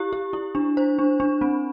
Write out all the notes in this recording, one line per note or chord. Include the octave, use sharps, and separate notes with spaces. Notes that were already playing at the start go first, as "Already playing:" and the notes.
Already playing: E4 G4
G4
E4
D4
C5
D4
D4
C4